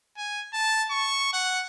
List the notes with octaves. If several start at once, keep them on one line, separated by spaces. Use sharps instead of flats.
G#5
A5
C#6
F#5